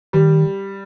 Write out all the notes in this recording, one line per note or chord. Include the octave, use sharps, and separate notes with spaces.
D#3 G3